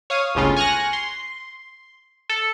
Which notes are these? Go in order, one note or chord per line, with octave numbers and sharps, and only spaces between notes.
C#5 F5 D#6
G1 C#2 A2 C#3 C#4 F4
G#5 C#6 F6 F#6 A#6
C6
A4